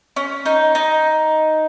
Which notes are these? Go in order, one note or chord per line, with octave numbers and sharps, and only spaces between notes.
C#4
D#4
D#4